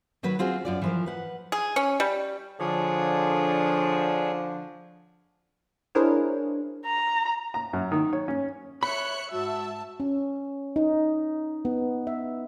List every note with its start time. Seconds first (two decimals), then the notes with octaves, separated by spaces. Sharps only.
0.23 D#3 F#3 F#4 B4 C#5
0.39 C4 F4 F#4 G#4
0.65 F#2 F4 D5
0.82 E3 F3 A#4
1.06 B4 F#5
1.52 G#4
1.76 C#4
2.00 G3
2.60 D3 F3 D4 G#4 C#5
5.95 D4 E4 G#4 A#4 C5 C#5
6.86 A#5
7.54 A#5
7.73 F#2
7.92 D#3
8.13 C#5
8.28 C#4
8.83 C#5 E5 B5 F#6 C#7
9.32 G#2 F#4 E5 A5
10.00 C#4
10.76 D#4
11.65 B3
12.07 E5